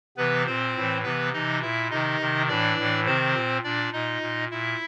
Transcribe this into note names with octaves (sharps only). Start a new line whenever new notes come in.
C3 E3 B3 B4
A#2 C4 C5
A2 E3
C3 E3 B3 B4
C3 E3 D#4 D#5
A#2 E4 E5
C3 D#3 D#4 D#5
C3 D#3
A2 E3 D4 D5
A2 E3
C3 D#3 C4 C5
A#2
A#2 D4 D5
A#2 D#4 D#5
A#2
A#2 E4 E5